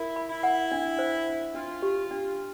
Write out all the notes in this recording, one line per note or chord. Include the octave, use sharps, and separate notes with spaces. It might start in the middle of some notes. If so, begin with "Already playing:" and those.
Already playing: E4 A#4
B5
E4
F#5
D4
C5
D4
D4 F4
G4
D4